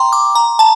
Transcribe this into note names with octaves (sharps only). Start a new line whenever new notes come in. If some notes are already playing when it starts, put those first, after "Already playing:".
Already playing: G5 A#5 C6
D6
A#5
A5